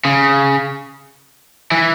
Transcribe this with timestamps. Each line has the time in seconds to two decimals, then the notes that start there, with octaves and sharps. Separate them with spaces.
0.05 C#3
1.71 E3